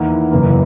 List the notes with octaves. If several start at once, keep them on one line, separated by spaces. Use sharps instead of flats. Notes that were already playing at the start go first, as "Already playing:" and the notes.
Already playing: E2 D#3 A#3 E4
F#1 F#2 C#3 E3 A#3